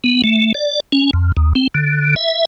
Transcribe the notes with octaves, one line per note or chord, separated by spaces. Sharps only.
B3
A3
D5
C#4
F2
D#2
C4
D3
E5